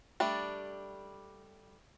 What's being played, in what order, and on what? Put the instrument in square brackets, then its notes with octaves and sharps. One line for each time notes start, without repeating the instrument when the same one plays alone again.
[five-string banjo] G3 A3 D4